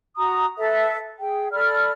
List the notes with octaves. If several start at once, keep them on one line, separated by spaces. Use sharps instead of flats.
F#4 A#5 D#6
A4 B4 E5
G#4 G5
A4 D5 B5 F6